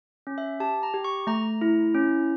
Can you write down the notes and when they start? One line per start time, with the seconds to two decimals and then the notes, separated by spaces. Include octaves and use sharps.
0.27 C#4
0.38 E5
0.60 G4 A5
0.83 A#5
0.94 G4
1.04 C#6
1.27 A3 A#5
1.61 E4
1.94 C#4